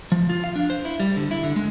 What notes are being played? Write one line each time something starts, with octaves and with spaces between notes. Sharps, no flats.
F3
F4
F5
D4
C5
E4
G3
D3
E4
D3
G#3